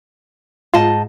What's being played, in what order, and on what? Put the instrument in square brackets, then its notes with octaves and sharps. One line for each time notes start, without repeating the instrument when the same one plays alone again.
[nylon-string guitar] G#2 D#5 A5 [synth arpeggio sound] F4